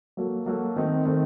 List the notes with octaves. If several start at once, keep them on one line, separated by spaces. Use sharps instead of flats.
F#3 A#3 F#4 A4
F#3 A#3 F#4 A4
D#3 A3 C4 D#4
D#3 A3 C4 D#4